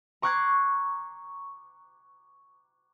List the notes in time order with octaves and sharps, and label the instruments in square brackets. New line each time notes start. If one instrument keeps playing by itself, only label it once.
[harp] A#5 C#6 D6 F#6 G#6 C7